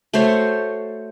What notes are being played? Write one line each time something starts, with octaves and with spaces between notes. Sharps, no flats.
A3 F#4 C5 C#5